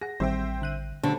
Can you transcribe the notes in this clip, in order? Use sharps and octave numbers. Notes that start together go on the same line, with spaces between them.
G#4 F#5 A#6
A1 D#3 G3 C4 C5 E5 G5
D3 F#6 D#7
D3 F#3 G3 A3 C5 A5